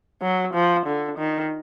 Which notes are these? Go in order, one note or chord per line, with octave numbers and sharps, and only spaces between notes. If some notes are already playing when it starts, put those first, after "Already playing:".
F#3
F3
D3
D#3